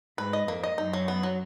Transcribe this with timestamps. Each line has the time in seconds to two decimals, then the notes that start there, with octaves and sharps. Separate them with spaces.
0.18 G#2 B4
0.33 D#5
0.48 F2 A#3
0.63 D#5
0.78 F#2 D#4
0.93 F#3
1.08 B3
1.23 F#3